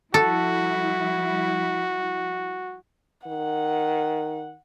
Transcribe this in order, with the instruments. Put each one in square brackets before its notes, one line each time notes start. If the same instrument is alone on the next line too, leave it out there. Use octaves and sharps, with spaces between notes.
[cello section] F3 G3 E4 [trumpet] F#4 [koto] A4
[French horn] D#3 [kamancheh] F#5